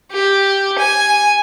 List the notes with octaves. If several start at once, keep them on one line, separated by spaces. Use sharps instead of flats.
G4
G#5